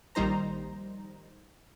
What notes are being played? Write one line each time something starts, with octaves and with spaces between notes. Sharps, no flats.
A#1 D#3 G3 D#4 C5 A#5